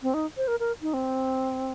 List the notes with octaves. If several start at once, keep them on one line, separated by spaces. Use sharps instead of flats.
C4
D#4
C5
A#4
A#4
D#4
C4